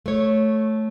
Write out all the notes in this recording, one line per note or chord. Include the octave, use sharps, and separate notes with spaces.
A3 C#5